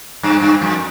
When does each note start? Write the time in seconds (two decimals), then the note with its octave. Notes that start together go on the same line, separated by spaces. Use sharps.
0.23 G2
0.41 G2
0.61 F2